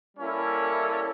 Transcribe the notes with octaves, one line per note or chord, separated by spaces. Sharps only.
G3 A#3 C#4 E4 A4